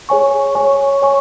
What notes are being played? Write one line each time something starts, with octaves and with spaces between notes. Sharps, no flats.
G#4 C#5 G#5 C#6
C#5 G#5 C#6
C#5 G#5 C#6